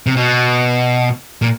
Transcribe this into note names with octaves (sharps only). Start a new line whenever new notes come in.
C3
B2
A#2